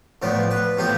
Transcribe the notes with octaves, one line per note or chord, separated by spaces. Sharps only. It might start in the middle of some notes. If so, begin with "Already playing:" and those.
A2 F3 B3 D5
B4
A2 F3 B3 G4